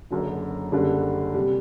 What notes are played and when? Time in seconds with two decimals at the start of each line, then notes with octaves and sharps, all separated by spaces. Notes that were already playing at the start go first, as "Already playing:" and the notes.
0.10 F#1 F#2 D3 F#3
0.72 F#1 F#2 D3 G3
1.34 C3 G3